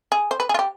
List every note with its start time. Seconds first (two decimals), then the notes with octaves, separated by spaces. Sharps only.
0.12 G#4
0.31 C5
0.40 B4
0.49 G#4
0.54 F4
0.59 G4